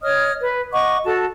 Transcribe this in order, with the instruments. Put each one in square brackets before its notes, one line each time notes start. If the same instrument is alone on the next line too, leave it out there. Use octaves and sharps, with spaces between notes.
[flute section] C#5 D#5 D#6 F6
B4
D#5 F#5 C#6 D6
F#4 A4 A5